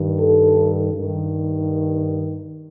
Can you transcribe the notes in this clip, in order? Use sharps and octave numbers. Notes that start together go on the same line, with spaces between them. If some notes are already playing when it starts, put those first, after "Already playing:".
Already playing: G2 D#3
A4
G2 D#3